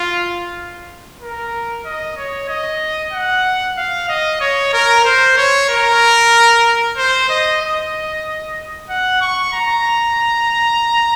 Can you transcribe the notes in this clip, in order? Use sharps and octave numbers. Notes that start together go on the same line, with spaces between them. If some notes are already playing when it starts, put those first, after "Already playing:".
Already playing: F4
A#4
D#5
C#5
D#5
F#5
F5
D#5
C#5
A#4
C5
C#5
A#4
C5
D#5
D#5
F#5
C#6
A#5